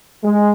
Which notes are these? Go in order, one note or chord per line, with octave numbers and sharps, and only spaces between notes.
G#3